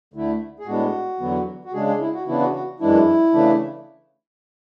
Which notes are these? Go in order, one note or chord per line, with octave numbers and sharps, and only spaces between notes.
D2 D3 A3 E4
G#4
A2 G#3 B3 D4 F#4
E2 D3 F#3 B3
F#4
C#3 G#3 D4 G#4
G#4
E4
F#4
C#3 E3 B3 D4 E4
F#4
F#4
F#2 E3 G#3 D4 E4
C#3 E3 A3 D4